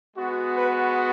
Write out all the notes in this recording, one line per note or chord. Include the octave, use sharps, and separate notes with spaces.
G#3 B3 F#4
B4